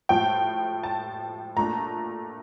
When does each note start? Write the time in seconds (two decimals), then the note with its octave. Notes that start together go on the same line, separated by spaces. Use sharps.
0.09 A2 F3 A3 G5
0.83 A5
1.56 A#2 A3 D4 A#5